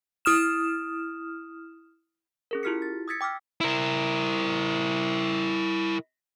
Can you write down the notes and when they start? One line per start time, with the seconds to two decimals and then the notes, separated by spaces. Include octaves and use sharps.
0.25 E4 D#6 F6 E7
2.51 C#4 G#4 A#4
2.63 E4 F4 G4 F6 B6 C#7
2.82 A6
3.08 D#6 E6 G#6 A6 B6 C#7
3.21 G5 D6 E6 F6 B6
3.61 E4 A#4